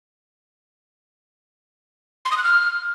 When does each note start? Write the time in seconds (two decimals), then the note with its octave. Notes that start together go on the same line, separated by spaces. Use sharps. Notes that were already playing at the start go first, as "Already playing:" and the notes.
2.25 C6
2.31 D#6
2.38 F#6
2.44 F6